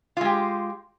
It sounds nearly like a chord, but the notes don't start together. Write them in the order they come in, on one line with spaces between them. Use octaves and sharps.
F4 G#3 G4